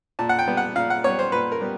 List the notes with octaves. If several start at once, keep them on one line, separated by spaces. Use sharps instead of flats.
A#2 A5
F#5
G5
G3 B3
F#5
A#2 F5
F#5
G3 B3 C#5
C5
A#2 B4
A#4
G3 B3